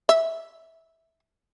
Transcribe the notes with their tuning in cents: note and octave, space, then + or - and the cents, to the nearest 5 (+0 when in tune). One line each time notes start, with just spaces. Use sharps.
E5 -15